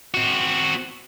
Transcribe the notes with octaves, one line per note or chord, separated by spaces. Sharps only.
C4 F#4